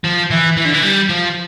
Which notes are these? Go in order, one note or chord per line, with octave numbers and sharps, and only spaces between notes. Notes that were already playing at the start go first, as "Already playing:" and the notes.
F3
E3
E3
D3
E3
G3
F3